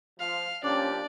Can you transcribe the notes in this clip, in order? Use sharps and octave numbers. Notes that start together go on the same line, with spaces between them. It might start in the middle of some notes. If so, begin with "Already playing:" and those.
F3 F4 F5
F3 A#3 C#4 D4 G4 D5